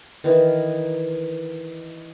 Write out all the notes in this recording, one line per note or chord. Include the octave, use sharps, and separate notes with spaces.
D#3 E3 D#4